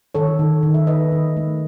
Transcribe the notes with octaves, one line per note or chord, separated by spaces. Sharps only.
D#3 A4 C#5
D#3
D#3
E5
D#3 B4 D#5
D#3
A3